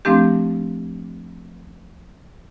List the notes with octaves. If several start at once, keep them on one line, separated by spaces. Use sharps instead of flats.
F3 A3 C4 D4 G4